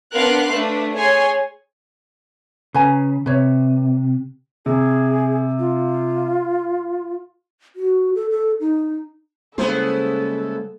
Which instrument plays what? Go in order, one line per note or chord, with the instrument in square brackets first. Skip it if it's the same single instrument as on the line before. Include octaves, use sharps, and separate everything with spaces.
[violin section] B3 D4 A#4 F5 C6 F#6
A3 D4 B4
G#4 C#5 G#5 C6
[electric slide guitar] C#3 [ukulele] B4 G#5 A#5
[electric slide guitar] C3 [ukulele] B4 C#5
[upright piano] C3 [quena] G#4
[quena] F4
[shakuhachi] F#4
A4
A4
D#4
[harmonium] C#3 [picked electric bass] G3 G#3 A#3 [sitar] B3 E4 C5 [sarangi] A4